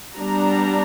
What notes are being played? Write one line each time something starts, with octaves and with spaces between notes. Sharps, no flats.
G3 B3 D4 A#5